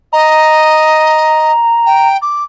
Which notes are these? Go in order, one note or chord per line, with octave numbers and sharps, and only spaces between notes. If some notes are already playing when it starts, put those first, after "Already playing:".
D#5 A#5
G5
D6